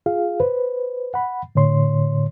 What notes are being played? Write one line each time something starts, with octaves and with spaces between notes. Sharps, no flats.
F4 G#4 F5
B4 C5
F#5 B5
A2 D3 C#5 C6